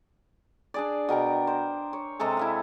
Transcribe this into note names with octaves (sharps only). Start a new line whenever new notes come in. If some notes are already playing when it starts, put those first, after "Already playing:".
D4 G#4 D5
B2 A#4 G5 A#5
C5
C#5
C3 G#3 A4 A#5
E4 E5 F5